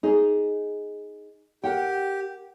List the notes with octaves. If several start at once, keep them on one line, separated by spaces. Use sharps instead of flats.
D#4 G#4
G4 A#4 F#5 G5